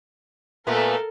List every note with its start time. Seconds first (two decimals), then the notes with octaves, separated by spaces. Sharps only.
0.67 A#2 A3 B3 A4 A#4